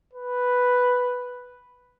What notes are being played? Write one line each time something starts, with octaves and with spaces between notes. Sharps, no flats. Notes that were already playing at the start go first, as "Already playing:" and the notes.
B4